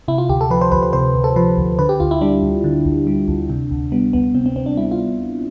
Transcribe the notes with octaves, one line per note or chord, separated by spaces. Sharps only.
C3 E4
F4
D2 G4
A4
F3 B4
C5
D2 B4
C5
C3 C5
D2
A4
F3 B4
D2
D3 B4
G4
D2 F4
E4
G3 D4
D2
D3
D2
G3
D2
C3
D2
G3 B3
D2 B3
C3 C4
C4
D2 C4
D4
G3 E4
F4